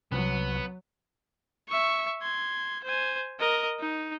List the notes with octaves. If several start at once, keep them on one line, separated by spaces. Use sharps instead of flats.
C2 F#3 B3
E5 C#6
C6 G#6
C5 G#5
A#4 D#5
D#4